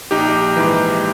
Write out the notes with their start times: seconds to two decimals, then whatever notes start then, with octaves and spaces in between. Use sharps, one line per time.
0.11 A#1 D#4 G4
0.57 G#2 E3